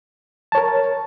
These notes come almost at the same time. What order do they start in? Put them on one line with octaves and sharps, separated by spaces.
A5 C#5 A#4